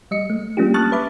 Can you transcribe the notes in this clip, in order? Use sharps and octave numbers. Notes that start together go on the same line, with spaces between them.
G3 D#5 C#7
A3
G3 A#3 C#4 D4 F4 G4
A5 C#6 D#6 F6 F#6 A6
B4 E5 B5 D6